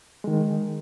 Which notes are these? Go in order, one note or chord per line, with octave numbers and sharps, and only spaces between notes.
D#3 G#3